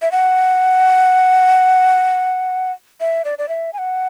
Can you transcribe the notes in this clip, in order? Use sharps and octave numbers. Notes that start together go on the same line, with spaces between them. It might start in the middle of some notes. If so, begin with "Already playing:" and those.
E5
F#5
E5
D5
D5
E5
G#5
F#5